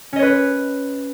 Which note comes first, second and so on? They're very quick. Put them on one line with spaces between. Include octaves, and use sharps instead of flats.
C#4 D#5 C#5 B4